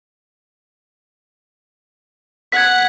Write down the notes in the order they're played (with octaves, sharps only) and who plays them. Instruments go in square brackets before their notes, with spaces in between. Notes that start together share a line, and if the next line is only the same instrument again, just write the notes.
[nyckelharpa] F#5 [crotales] G#6 B6